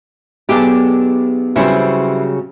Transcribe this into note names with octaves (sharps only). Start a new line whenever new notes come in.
B1 D4 G4 G#4 A5
C#3 E3 F#3 G3 C4